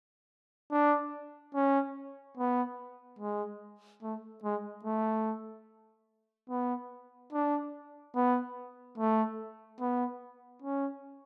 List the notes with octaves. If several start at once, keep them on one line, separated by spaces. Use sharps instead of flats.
D4
C#4
B3
G#3
A3
G#3
A3
B3
D4
B3
A3
B3
C#4